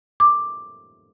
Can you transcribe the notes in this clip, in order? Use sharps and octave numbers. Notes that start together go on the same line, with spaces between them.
D6